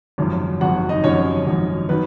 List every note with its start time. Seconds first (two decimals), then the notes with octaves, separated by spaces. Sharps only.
0.18 G#1 F#2 F3
0.61 G#1 F#2 F3 F#4 F#5
0.89 D#4 D#5
1.04 G#1 F#2 F3 C#4 C#5
1.46 G#1 F#2 F3
1.89 D#3 F#3 B3 B4